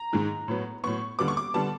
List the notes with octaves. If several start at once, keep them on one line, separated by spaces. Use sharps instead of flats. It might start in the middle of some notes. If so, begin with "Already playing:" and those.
Already playing: A#5
G#2 D#3 G#3
A2 F#3 B3
A2 F#3 B3 C#6
D#2 D3 G3 B3 D6
C#6
D6
D3 G3 B3 A5